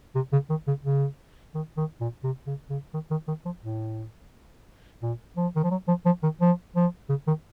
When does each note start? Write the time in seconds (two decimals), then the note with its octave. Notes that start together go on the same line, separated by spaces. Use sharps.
0.15 C3
0.33 C#3
0.50 D#3
0.67 C#3
0.85 C#3
1.55 D#3
1.77 D#3
2.01 A#2
2.24 C3
2.47 C#3
2.70 C#3
2.94 D#3
3.11 D#3
3.28 D#3
3.45 F3
3.63 A2
5.02 A#2
5.37 F3
5.56 D#3
5.64 F3
5.71 F#3
5.88 F3
6.06 F3
6.23 D#3
6.41 F3
6.76 F3
7.09 C#3
7.27 D#3